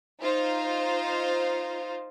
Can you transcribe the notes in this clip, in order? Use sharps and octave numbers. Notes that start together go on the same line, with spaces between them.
D#4 F4 C5